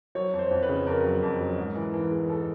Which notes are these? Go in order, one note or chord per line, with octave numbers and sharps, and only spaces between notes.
F#3 C#5
F2
C5
F2
B4
C#3
F2 A#4
F#3
F2
F#3
G#2
E3
E3
G#3
A4